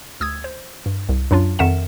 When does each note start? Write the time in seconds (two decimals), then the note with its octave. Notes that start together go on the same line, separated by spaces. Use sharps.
0.20 D2 D#6 E6 G#6
0.44 C5
0.86 G2
1.09 C2
1.31 F#2 F#3 D4 F4
1.59 F2 D#3 A#4 E5 F#5 E7